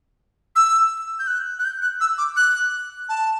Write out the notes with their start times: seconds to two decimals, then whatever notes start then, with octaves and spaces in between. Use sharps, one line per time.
0.56 E6
1.19 G6
1.27 F#6
1.59 F#6
1.64 G6
1.82 F#6
2.01 E6
2.18 D6
2.36 F#6
3.09 A5